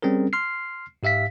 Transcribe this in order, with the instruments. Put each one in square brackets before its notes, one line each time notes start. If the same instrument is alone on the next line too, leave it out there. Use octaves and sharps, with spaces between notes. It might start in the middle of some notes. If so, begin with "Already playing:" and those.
[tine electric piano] G3 C4 C#4 G#4 A#4
C6 F6 C7
G#2 G4 E5 F5 B6